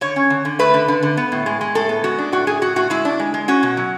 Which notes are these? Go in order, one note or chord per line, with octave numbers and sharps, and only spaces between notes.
D3 C#5
C#4
D3
D3
A3 B4
D3
D3
D3
B3
A2
G#3
G#3
A2 A4
B3
G#3 F#4
D4
A2 F#4
A2 G#4
A2 F#4
A2 F#4
G#3 E4
D4
G#3
G#3
C#4 F#4
B2
F#3